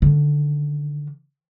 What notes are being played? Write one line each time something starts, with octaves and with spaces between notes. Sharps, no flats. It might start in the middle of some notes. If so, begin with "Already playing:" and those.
D3 D#3